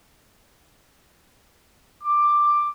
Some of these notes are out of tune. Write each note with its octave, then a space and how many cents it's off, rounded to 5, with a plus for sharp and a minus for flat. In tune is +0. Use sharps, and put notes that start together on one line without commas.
D6 +10